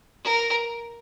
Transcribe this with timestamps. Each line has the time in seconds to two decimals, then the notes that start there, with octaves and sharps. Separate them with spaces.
0.24 A#4